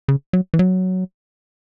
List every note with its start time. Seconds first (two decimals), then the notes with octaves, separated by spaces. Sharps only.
0.08 C#3
0.33 F#3
0.54 E3
0.59 F#3